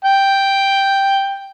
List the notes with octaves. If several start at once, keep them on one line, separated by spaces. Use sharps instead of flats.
G5